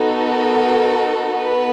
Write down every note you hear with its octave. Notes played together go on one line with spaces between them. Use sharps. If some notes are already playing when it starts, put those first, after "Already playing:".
Already playing: B3 D#4 F#4 A4
A#4
B3 B4